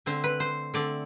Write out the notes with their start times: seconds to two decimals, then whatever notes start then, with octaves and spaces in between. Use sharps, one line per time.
0.06 D3 A3 C4 C5
0.24 B4
0.40 C5
0.74 D3 A3 C4 D5